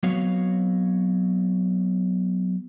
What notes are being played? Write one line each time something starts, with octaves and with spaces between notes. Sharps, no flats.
F#3 B3 C4 F#4 C#5 F5